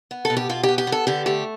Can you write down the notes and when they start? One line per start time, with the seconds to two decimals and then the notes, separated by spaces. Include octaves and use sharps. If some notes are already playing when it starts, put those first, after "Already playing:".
0.11 B3
0.25 A4
0.30 B2
0.37 G4
0.49 B2 F4
0.63 G4
0.68 B3
0.78 G4
0.87 B3
0.92 A4
1.07 D3 G4
1.26 A3 G4